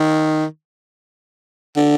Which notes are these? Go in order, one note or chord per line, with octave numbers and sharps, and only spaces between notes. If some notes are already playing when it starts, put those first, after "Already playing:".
Already playing: D#3
D3